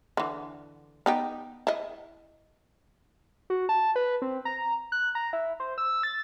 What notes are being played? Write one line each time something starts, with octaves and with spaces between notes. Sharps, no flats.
D3 E3
B3 D#4 G4
E4 D#5
F#4
A5
B4
C4
A#5
F#6
A#5
E4
C5
E6
A6